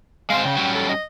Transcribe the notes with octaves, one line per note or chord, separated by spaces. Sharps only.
G#3 C4 C5 F5
C#3 G5
F#3 G3 C#4
A4
D#5